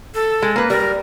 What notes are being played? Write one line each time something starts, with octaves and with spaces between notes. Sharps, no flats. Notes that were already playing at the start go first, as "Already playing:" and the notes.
A4
G#3
A#3 B4
G3 A#4